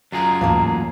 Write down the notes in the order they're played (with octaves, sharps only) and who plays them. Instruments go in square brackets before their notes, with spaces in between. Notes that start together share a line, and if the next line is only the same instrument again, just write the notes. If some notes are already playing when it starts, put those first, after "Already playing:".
[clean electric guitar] F#2 F4 G#4 [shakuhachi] A#5
[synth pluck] D2 G#2 E3 [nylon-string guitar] A#3 F5 A5